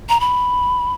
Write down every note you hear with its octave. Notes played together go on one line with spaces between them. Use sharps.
A#5
B5